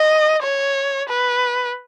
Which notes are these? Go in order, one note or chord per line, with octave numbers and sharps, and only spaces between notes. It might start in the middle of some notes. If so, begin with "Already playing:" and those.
Already playing: D#5
C#5
B4